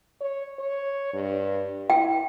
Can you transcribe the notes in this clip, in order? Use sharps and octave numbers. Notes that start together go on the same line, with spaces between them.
C#5
C#5
G2
E4 G5